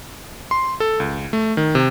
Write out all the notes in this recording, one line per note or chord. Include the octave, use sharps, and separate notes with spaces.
C6
A4
C#2
A3
D#3
C3